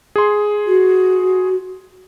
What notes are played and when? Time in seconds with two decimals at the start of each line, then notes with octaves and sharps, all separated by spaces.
0.16 G#4 C6
0.67 F#4